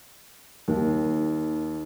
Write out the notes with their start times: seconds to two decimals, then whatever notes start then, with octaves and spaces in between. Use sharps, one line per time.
0.68 D#2